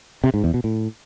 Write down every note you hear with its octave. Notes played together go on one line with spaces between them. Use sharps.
C3
G#2
E2
B2
A2